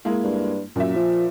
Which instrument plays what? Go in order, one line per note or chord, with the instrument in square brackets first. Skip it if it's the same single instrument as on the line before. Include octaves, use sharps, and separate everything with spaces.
[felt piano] G#3 A#3 E4
[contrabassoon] G2
[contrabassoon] F#2 [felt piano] A#2 E5
[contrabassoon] F3